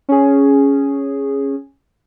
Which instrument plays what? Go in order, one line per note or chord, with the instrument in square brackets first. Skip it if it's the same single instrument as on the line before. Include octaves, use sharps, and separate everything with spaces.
[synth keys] C#4 G#4